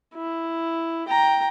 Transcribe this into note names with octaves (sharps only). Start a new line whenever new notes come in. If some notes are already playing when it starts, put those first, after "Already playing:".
E4
G5 A#5